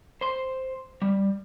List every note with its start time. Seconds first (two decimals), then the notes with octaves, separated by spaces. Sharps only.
0.21 C5 C6
1.02 G3